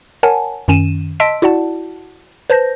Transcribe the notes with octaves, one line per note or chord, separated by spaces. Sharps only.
A#4 C#5 F#5 G#5 A5
F#2 D#3 C#4 D#7 E7
D#5 A5 C6 E6 B6 D7
E4 F#4 D5 F#5 A5
B4 C5 A5 G6 A#6